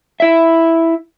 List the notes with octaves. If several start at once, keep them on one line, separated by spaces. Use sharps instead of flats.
E4 E5